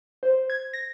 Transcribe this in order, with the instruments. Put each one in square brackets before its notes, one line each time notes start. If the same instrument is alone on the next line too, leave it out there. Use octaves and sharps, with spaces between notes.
[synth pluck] C5
G#6
A#6